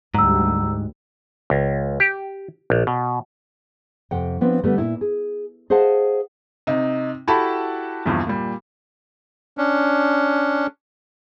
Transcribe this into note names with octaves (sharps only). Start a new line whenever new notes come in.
D2 G#2 G3 A#5 E6
C#2
G4
A#1
B2
F2 C3 F#5 G5
F3 B3 C4 D4
D3 G3 A3 B3
A#2 E4
G#4
G#4 C5 D#5 F5 F#5 A5
C3 D#4
E4 F#4 G4 A4 A5 B5
A#1 E2 G2
A#2 G3
C#4 D4